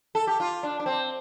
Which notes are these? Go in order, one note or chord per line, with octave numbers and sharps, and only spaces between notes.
A4
G4
F4
D4
D4
C4